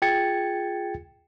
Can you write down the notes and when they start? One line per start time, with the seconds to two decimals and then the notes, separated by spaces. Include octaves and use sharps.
0.02 F4 G#4 G5 G#6 A6 C#7